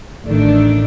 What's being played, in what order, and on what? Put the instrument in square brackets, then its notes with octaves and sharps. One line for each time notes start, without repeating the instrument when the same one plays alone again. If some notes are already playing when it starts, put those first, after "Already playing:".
[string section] A1 D#3 A3 D4